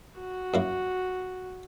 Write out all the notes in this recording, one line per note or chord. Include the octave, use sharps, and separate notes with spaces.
F#4
F#2 A#3 E4